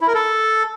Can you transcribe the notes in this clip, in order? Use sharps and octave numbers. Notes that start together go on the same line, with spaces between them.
E4
A#4
A4